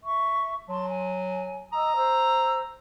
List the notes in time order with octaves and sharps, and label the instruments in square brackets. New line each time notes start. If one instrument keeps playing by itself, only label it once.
[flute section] E5 C#6
[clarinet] F#3 [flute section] A5 C6
[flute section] G#5
[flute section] D#5 D#6 E6 [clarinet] A#5
[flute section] C5 E6